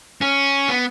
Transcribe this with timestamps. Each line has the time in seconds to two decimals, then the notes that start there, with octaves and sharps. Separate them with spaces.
0.21 C#4
0.69 B3